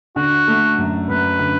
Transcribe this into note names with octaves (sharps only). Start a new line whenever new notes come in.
D3 F#4
A3
F#2
F#2 B4
D3